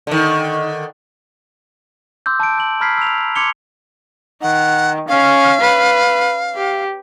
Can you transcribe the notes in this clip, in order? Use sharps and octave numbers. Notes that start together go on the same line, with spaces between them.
D3 D#3
C6 D6 E6 G6
A5 D7
G6 F#7
A#5 B5 F6 G#6 B6 C7
E6 G6 F7
C6 D6 G#6 C#7 F7 G7
D#3 F#5
C#4 F5
B4
G4